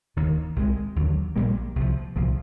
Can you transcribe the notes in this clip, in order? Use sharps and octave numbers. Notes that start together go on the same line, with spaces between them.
F1 D#2 D#3
C2 C3 F3 G#3
D#2 D3 F#3
A#1 A#2 G3 A#3
C2 C3 F3
C2 A#2 F3